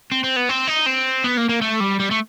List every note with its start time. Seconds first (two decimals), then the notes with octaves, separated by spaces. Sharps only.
0.11 C4
0.24 C4
0.36 B3
0.49 C4
0.67 D#4
0.86 C4
1.24 B3
1.37 A#3
1.49 A#3
1.61 A3
1.80 G3
2.00 G3
2.11 A3